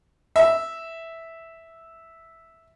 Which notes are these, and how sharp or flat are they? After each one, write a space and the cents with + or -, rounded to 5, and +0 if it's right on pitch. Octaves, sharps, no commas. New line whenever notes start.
E5 -5